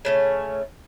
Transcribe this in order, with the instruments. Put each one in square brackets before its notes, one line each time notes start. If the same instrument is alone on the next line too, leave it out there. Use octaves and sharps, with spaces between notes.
[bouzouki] C#3 A3 C#4